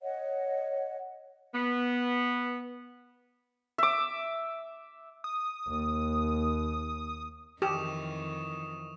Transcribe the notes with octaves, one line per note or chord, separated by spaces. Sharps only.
C#5 D#5 F#5
B3
E5 D6
D#6
D#2
F2 D#3 E3 G4 C#6 D#6 E7